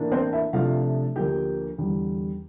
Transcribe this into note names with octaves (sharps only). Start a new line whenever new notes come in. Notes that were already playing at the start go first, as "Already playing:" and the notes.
Already playing: A2 E3 A#3 D4
C4 C5
E4 E5
C3 F3 A3 D4 F4 F5
D2 D3 F3 A#3 G4 G5
E2 D3 G3